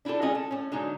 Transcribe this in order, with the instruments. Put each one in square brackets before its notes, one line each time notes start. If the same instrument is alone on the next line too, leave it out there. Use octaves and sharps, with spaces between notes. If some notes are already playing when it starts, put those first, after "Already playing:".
[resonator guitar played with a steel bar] D4 E4 F4 G4 A4
D#3 G#3 C#4 F4 G#4 D#5
A4
A2 C#4
D3 F#3 G#3 D#4 A#5